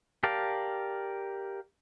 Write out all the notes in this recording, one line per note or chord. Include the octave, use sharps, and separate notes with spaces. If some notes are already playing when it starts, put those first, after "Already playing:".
G4 A#4 D5 F5 A5